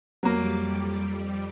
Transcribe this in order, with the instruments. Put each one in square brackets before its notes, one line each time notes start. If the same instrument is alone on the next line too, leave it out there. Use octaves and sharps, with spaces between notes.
[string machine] F2 G3 D6 [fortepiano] F#3 A#3